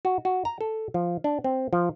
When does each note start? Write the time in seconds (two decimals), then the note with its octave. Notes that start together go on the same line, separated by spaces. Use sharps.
0.05 F#4
0.25 F#4
0.45 A#5
0.61 A4
0.94 F3
1.24 D4
1.44 C4
1.73 F3